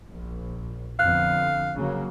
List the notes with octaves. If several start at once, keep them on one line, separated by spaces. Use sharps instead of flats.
A#1
F2 D3 B3 F5 F#6
C#3 F#3 A#3